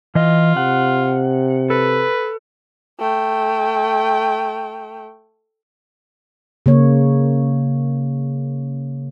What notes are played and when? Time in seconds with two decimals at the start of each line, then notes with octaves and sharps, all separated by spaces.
0.15 E3 F4 D#5
0.57 C3 F#5
1.70 A4 B4
2.99 A3 G5
6.66 C#3 A#3 C#5